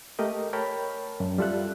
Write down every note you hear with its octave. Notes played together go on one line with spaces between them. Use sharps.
A3 G4 A#4 D#5
A#4 C#5 G5 A5 B5
F#2
G3 F4 A4 E5 F#6